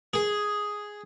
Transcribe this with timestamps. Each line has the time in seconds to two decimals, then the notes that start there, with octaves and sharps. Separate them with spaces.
0.14 G#4